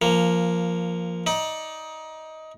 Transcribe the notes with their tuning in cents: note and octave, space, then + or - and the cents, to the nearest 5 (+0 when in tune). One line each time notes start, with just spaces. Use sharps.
F3 -10 A#3 +0
D#4 +20 D5 +20